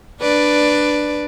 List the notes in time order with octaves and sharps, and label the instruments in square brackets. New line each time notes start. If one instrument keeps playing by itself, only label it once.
[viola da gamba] D4 B4 D5